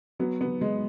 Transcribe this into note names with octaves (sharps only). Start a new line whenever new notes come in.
F#3 B3
B3
F#3
G#3